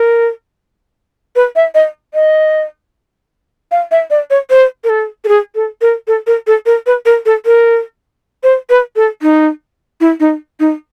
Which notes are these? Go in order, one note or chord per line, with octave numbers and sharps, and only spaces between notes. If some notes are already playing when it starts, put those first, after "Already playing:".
Already playing: A#4
B4
E5
D#5
D#5
F5
E5
D5
C#5
C5
A#4
A4
A4
G#4
A4
A#4
A4
A#4
A4
A#4
B4
A#4
A4
A#4
C5
B4
A4
D#4
E4
D#4
D#4